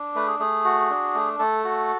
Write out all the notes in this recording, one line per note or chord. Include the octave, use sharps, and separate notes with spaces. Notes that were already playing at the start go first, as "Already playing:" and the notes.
Already playing: D4
A3 B4
G#4
A3 G#4
F#4
D4
A3
A3 A4
F#4